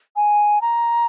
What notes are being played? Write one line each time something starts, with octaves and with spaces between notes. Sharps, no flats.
G#5
A#5